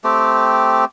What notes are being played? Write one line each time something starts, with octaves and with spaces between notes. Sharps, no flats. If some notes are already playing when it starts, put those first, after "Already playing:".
A3 C4 G4